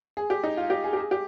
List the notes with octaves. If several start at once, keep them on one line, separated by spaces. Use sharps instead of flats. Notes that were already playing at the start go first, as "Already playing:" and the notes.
G#4
G4
D#4
F4
G4
G#4
G4
G#4
G4